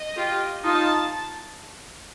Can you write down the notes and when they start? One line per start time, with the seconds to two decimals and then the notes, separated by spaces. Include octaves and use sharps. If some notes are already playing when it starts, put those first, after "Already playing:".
Already playing: D#5
0.16 F4 G4
0.64 D#4 F4 A5